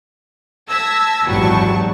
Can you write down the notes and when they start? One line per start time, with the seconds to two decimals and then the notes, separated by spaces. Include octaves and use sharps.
0.67 A5 E6 G#6 A#6 B6
1.26 G#1 E2 F#3 G3 A5 C#6